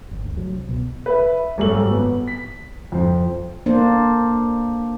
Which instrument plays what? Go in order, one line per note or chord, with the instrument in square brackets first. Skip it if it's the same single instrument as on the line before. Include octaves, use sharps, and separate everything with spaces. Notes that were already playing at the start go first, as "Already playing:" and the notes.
[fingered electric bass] G1
D2
F#3
C2
B2
[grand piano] B4 E5
G#1 F#2 G3 A4 F#7
B3
B6
F2 C5
[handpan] A#3 D4 C5